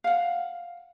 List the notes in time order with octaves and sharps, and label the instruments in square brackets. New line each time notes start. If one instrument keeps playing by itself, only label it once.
[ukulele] F5 F#5